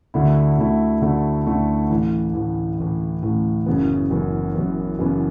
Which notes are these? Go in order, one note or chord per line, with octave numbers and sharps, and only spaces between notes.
D2 D3 A3 E4
D2 D3 A3 E4
D2 D3 A3 E4
D2 D3 A3 E4
A1 A2 E3
A1 A2 E3
A1 A2 E3
A1 A2 E3
F#1 F#2 C#3 E3 B3
F#1 F#2 C#3 E3 B3
F#1 F#2 C#3 E3 B3
F#1 F#2 C#3 E3 B3